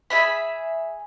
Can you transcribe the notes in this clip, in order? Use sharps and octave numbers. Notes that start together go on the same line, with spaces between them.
G#4 E5 B5